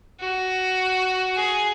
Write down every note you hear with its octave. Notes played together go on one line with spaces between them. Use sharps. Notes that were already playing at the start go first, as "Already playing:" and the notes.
F#4
G#4